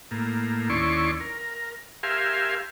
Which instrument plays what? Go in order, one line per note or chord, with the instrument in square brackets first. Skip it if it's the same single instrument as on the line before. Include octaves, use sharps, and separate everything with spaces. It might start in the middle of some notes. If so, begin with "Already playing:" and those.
[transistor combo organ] A2 A#3
D#2 C#4 E4 D5 C6 C#6
A#4
G4 A#4 E5 F5 G#5 C6